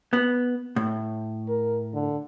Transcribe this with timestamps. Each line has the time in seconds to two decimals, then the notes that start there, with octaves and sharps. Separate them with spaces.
0.13 B3
0.76 A2
1.48 A#4
1.94 D3